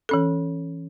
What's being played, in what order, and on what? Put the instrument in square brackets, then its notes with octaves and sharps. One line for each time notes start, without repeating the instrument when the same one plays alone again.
[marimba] E3 C#4 A4